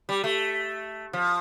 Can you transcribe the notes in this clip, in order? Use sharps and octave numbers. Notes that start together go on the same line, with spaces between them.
G3
A3
F3